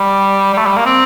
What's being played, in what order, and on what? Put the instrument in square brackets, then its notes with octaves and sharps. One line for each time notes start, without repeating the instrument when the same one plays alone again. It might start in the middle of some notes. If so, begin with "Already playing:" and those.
Already playing: [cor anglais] G3
G3
A3
G3
A#3
C4